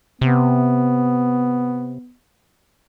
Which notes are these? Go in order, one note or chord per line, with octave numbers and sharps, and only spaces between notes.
C3 B3